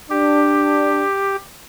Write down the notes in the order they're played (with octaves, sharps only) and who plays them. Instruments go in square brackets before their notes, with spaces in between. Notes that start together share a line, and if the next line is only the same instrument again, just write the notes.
[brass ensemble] D4 [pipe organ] G4